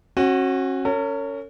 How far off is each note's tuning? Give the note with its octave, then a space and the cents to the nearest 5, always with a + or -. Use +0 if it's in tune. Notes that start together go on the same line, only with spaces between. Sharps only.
C#4 -40 F#4 +0
C#4 +10 A#4 -45